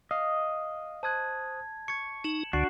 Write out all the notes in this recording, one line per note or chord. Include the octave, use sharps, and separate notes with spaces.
D#5 F5
C5 A5 D#6 F#6 G#6
C#6 G#6 C#7
D#4 E7 F#7
C#2 D3 D4 F#4 C7